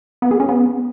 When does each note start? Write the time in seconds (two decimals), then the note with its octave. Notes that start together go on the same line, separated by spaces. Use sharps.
0.22 B3
0.31 G#4
0.40 C#4
0.49 B3